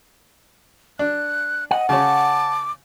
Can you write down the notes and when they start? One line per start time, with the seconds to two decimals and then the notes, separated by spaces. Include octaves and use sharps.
0.99 D4 F#6
1.71 D#5 F#5
1.89 C#3 C#4 A5 D6